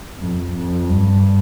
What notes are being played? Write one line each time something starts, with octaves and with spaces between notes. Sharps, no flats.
F2
F2
G2